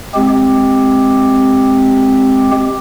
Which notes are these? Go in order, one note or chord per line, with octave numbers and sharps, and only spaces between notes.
G#3 C4 G4